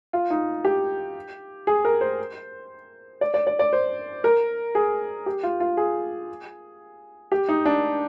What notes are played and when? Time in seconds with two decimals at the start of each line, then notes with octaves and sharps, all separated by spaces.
0.13 F4
0.30 D#4
0.65 G4
1.67 G#4
1.85 A#4
2.01 C5
3.21 D5
3.34 D5
3.47 D5
3.59 D5
3.73 C5
4.24 A#4
4.75 G#4
5.26 G4
5.43 F4
5.60 F4
5.77 G#4
7.32 G4
7.49 D#4
7.65 D4